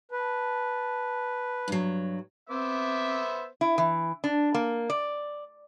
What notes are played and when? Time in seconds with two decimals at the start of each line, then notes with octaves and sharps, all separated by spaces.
0.12 B4 A5
1.68 G2 F#3
2.50 B3 C4 C5 E5 D6
3.61 E4
3.78 E3
4.24 D4
4.54 A#3
4.90 D5